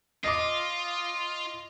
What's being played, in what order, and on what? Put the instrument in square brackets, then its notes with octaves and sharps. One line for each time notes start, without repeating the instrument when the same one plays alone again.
[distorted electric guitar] F4 [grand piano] D#5 D6